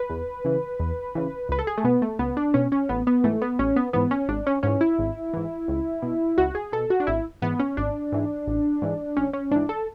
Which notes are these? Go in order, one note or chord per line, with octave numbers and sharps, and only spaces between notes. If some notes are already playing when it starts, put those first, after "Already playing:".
Already playing: B4
E2
C#3 E3
E2
C#3 E3
C#2 B4
A4
G#4
A3
B2 B3
A3
C#2 B3
D4
B2 C#4
C#4
A1 B3
B3
G#2 E3 A3
B3
A1 C#4
B3
G#2 E3 B3
C#4
G#1 D4
C#4
G#2 E3 C#4
E4
G#1
G#2 E3
C#2
B2
C#2 F#4
G#4
B2 A4
F#4
D4
G#1 E4
G#2 E3 B3
C#4
G#1 D4
G#2 E3
A1
G#2 E3
A1 C#4
C#4
G#2 E3 D4
A4